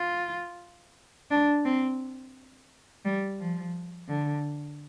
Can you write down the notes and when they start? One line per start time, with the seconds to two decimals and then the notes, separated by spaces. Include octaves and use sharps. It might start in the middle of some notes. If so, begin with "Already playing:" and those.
Already playing: F4
1.30 D4
1.65 C4
3.05 G3
3.39 F3
4.08 D3